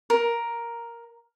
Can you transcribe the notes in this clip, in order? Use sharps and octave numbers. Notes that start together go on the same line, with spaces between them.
A#4